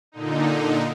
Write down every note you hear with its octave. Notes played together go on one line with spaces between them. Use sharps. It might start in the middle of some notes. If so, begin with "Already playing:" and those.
A#2 D3 D#4